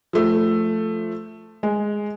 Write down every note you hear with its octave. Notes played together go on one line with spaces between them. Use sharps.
F3 A3
G#3